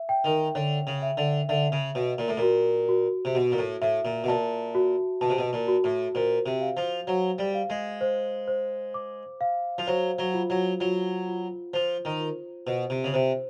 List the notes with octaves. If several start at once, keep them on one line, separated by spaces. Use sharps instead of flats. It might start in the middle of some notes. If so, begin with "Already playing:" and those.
Already playing: E5
G5
D#3
D3 C#5
C#3
E5
D3
D3 E5
C#3
B2 C#5
A#2
A2
A#2 F#4
F#4
C3
B2 F#4
A#2
A2
A2 E5
A#2
B2
A#2 A5
F#4
B2 A5
C3
B2
A#2
F#4
A2
A#2 C5
C3
F5
F3
F#3 C5
G3
F5
G#3
C5
C5
D6
F5
F3
F#3 C5
F#3
F4
F#3
F#3 F4
F4
F3 C5
D#3
F4
B2 C5
C3
C#3
C3 C5